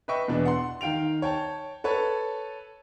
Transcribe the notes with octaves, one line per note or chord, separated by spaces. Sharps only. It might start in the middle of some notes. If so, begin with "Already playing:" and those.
B4 D#5 E5 G5 C#6
E2 B2 B3 D4
F#5 C6
D#3 F5 G5 D7 F7
C#5 G5 A5
A4 B4 C#5 A5